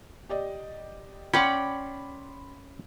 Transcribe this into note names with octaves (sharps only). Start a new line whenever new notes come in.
G4 D5 D#5
C#4 D5 F#5 G5 B5 C6